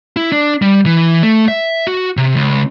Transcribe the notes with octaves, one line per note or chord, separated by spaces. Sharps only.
E4
D4
G3
E3
A3
E5
F#4
C3
C#2